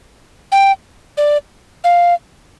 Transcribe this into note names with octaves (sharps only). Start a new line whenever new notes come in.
G5
D5
F5